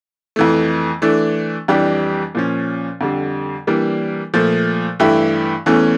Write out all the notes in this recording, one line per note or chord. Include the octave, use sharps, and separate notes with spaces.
F2 E3 A3
E3 A3 D4
F2 E3 G3 D4 G4
A#2 F3 C#4
F2 D3 G3
E3 G3 A#3 D4
A#2 F3 A3
G2 E3 A3 E4 G4
E2 E3 A3 C#4